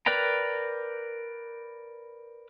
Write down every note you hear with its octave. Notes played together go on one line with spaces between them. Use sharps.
A#4 B4 D5 G5 A#5